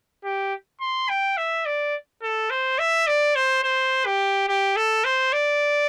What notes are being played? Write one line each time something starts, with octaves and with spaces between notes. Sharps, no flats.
G4
C6
G5
E5
D5
A4
C5
E5
D5
C5
C5
G4
G4
A4
C5
D5